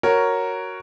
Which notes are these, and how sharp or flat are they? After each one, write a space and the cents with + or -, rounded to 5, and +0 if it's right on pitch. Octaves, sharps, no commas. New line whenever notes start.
F#4 +5 A#4 +0 C#5 +0